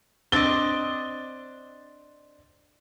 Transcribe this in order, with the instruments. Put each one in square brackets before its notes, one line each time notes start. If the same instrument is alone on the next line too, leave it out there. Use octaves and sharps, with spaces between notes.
[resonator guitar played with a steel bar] C4 D4 D#5 [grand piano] A6 G7